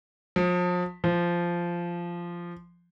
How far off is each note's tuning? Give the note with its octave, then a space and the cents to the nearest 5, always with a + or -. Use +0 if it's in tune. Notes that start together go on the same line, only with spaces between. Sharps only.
F3 +35
F3 -10